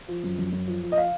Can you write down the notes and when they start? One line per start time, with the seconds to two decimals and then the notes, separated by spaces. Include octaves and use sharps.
0.08 F3
0.23 F#2
0.38 F#2
0.52 F#2
0.68 F3
0.83 F3
0.92 D#5
0.98 F5